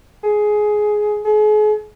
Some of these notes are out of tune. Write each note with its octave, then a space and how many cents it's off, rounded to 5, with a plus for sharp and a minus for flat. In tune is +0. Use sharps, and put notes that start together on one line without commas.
G#4 +15
G#4 +40